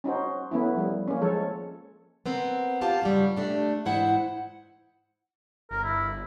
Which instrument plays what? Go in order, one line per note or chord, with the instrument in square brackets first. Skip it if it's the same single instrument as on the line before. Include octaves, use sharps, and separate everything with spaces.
[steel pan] C#4 D#4 F#4 C5
A3 B3 C#4 E4
F3 G3
A#3 C#4
F3 G#3 A4 C#5
[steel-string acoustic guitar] B3 C4 A#4
F4 G4 F5 A5
G2 C#3 G3
A3 D4 G4
G#2 E3 E4 C5 F#5
[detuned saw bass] G1 [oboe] A#4
[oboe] E4